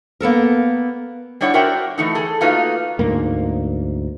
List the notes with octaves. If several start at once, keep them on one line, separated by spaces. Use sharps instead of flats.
A#3 B3 A4 A#4
G3 D4 E4 C#5 D5 F#5
F#4 A#4 C5 D5 E5 G5
E3 A3 D#4
G#4 A4
A3 A#3 D#4 F4 F#4 B4
D2 G#2 A#3